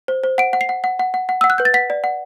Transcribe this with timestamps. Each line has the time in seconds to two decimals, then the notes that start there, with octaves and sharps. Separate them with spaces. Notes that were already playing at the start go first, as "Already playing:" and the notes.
0.08 C5
0.24 C5
0.38 F#5 D7
0.53 F#5
0.61 C7
0.69 F#5
0.84 F#5
0.99 F#5
1.14 F#5
1.29 F#5
1.41 F#5 E6
1.50 F#6
1.58 B4 G6
1.65 A6
1.74 F#5 B6
1.90 D5
2.04 F#5